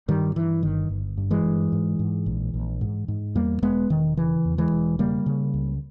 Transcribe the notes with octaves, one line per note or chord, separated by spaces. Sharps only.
G2 D#3 G3
G2 E3
G1 D#3
G1
G2
E3 G#3
G2
G#2
G#2
A#1
A#1
G#2
G#2
E2 G3 A#3
E1 G#3 B3
E1 D#3
C#3 E3
E2
E3 G#3
E1
C#3 G3 A#3
C#3
C#2